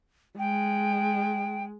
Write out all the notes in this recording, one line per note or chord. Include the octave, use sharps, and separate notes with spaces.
G#3 G5